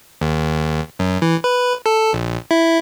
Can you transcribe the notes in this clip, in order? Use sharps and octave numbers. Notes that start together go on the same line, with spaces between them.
D#2
F#2
E3
B4
A4
A#1
E4